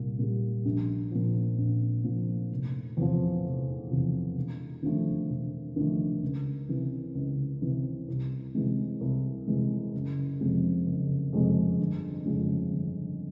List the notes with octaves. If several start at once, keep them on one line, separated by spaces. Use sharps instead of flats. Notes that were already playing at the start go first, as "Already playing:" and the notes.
Already playing: C2 A#2 G3
A#2 G3
A#1
A#2 F3
A#1
A#2 F3
F1
E2 C3 F3
F1
E2 C3 F3
E1
D#2 D3 F3 A3
E1
D#2 D3 F3 A3
C#2
C3 E3
C#2
C3 E3
C2
C3 E3 G#3
C2
C3 E3 G#3
F#1
F2 C3 F3 G#3
F#1
F2 C3 F3 G#3
G1
F2 C#3 F3 G#3
G1